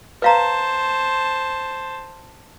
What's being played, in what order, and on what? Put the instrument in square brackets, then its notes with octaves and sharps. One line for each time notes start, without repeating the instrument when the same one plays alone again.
[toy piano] B4 F5 A#5 [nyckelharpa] C5 A5